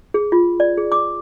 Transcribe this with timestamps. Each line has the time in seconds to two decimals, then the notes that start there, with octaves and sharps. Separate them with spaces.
0.14 G#4
0.32 F4
0.60 D5
0.77 G#4
0.92 D6